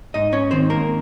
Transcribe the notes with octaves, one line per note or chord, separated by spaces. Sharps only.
G#2 D#4 D#5
C#4 C#5
D#3 C4 C5
A#3 A#4